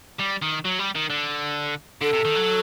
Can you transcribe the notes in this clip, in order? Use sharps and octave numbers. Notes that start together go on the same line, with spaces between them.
G3
D#3
F#3
G3
D#3
D3
D3 A4
C3
D#3
F#3